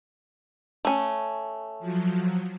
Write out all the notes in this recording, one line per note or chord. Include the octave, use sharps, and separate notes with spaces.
A3 C#4
F3 F#3